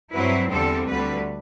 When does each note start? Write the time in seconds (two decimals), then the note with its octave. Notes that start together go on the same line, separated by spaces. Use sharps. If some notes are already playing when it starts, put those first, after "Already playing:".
0.13 G2 F#3 C4 E4 B4
0.51 E2 D3 G3 C4 A4
0.89 D2 D3 G3 B4